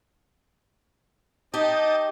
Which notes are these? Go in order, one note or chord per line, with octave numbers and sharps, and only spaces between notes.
D#4 G4 D#5 G5 A5 D#6